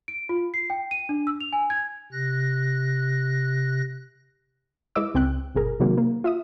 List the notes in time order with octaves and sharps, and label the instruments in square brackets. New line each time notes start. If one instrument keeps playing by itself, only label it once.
[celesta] D7
F4
C7
G5
D#7
D4
E6
F7
G#5
G#6
[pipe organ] C3 F#6 A#6
[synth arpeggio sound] G#3 E4 B4 D#5 D6 E6
C#2 C4 G5 F#6
G1 B2 G#4 A#4
C3 D#3 F#3 G#3 A#3 F#4
A#3
F4 E5 D#6